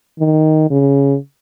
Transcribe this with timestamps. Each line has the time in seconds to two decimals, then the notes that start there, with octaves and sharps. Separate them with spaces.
0.19 D#3
0.70 C#3